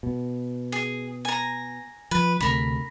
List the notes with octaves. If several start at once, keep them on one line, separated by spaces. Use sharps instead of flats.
B2
G#4
G#5 A#5
F3 B4
D2 C3 A3 A#4 B5